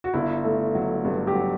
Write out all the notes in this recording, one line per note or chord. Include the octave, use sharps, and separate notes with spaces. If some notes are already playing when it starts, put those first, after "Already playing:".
F#4
G1 E4
A3
F#3
G2
G4
F#3